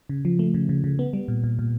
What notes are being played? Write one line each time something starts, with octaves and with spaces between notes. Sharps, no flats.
C#3
F3
A3
C#3
C#3
C#3
B3
G3
A#2
A#2
A#2